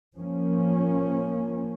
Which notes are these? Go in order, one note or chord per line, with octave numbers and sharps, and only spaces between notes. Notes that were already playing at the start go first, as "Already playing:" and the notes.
F3 A#3 C#4